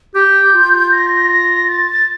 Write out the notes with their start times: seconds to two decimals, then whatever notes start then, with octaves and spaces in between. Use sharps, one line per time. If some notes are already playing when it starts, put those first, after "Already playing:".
0.15 G4 G6
0.53 F4
0.92 A#6
1.69 A6